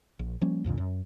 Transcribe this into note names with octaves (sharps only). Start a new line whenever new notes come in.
A#1
F3 G3 A#3 C#4
C2 F2 A#2 D3
F#2